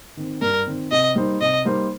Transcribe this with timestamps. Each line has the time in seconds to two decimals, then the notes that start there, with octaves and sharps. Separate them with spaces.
0.17 D#3 C4
0.42 G2 A#4
0.66 D#3 C4
0.92 C3 D#5
1.16 G3 A#3 D#4 C5
1.41 C3 D#5
1.65 G3 A#3 D#4 C5